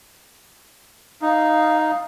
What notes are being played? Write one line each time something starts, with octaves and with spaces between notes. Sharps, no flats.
D#4 F5